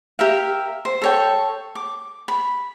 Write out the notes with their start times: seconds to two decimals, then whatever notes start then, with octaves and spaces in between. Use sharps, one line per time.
0.19 G4 A#4 E5 F5
0.85 C5
1.02 A4 C#5 G5
1.75 D6
2.28 B5